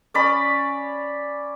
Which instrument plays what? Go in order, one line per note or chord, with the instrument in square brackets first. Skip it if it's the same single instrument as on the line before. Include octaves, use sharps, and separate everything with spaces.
[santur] C#4 D5 B5